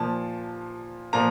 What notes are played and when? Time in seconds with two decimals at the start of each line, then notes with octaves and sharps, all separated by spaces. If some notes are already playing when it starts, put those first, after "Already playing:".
Already playing: A#2 F3 A5
1.13 A#2 F3 A#5